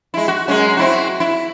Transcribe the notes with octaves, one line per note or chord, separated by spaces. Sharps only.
G#3 E4
F#4
F#2 G#3 C#4
C4 E4 F#4
E4